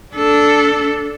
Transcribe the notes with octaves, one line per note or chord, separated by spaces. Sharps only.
D4 A4